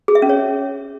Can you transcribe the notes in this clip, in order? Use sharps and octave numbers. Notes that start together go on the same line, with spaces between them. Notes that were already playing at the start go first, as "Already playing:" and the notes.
G#4
E5
C#4
C#5